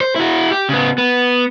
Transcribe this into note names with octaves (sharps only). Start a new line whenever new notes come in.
C5
E4 F#4
G4
C#3 B3
B3